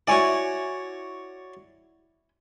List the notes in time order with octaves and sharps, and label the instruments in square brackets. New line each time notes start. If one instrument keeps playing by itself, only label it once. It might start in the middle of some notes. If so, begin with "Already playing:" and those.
[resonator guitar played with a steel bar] E4 G#5 [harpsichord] F#4 C#5 D5